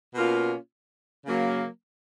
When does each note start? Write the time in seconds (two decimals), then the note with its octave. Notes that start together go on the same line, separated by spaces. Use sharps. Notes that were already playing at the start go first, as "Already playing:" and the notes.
0.14 B2 A#3 C#4 F4
1.26 C#3 F#3 A#3